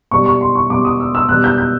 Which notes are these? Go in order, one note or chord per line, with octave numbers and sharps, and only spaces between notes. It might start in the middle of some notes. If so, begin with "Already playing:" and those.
B2 G3 C#6
C#6
C6
C#6
B2 G3 D6
D#6
E6
E6
B2 G3 F#6
G6
G6